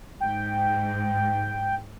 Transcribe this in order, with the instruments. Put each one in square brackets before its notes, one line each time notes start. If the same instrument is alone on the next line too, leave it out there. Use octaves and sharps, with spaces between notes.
[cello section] G#2 [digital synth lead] G5